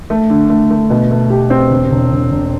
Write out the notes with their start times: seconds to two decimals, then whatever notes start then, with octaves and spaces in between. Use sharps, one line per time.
0.10 A3
0.30 D3
0.50 A3
0.71 A3
0.90 B2
1.11 A3
1.30 G4
1.50 C4
1.70 E1
1.91 E1
2.11 E1
2.31 E1